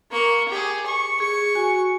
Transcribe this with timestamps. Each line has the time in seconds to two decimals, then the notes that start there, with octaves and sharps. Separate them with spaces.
0.11 A#3 C#6
0.49 G4 G#4
0.86 C#6
1.20 G#4 C#6
1.55 F#4 G#5